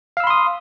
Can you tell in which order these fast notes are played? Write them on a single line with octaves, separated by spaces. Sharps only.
F5 E6 B5 C6 D#6